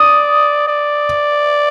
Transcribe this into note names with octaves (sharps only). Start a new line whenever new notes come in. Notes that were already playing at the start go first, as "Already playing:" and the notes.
Already playing: D5 D#6
D5